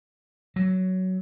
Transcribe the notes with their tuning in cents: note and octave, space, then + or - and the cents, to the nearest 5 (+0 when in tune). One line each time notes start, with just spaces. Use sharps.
F#3 +10